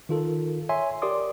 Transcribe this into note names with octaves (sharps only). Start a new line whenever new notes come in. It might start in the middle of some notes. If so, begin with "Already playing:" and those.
D#3 F4 A4 A#4
C#5 E5 G#5 C6
G4 A#4 D5 C6 D6 D#6